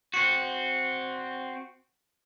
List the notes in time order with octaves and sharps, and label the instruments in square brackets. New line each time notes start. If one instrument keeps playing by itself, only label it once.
[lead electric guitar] C4 F#4